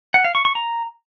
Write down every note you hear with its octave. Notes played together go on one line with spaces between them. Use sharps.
F#5
F5
C#6
C#6
A#5